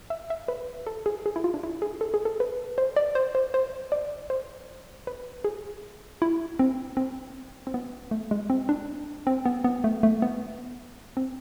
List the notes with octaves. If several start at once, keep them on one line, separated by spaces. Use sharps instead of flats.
E5
E5
B4
A4
G#4
G#4
E4
F4
D4
E4
G#4
A4
G#4
A4
B4
C5
D5
C5
C5
C5
D5
C5
B4
G#4
E4
C4
C4
C4
B3
A3
G#3
C4
D4
C4
B3
B3
A3
A3
B3
C4